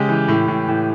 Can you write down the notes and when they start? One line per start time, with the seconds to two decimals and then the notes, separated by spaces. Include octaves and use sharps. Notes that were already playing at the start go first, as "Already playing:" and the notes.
Already playing: C#3 G#3 G4
0.09 E3
0.28 A2
0.48 A2
0.68 A2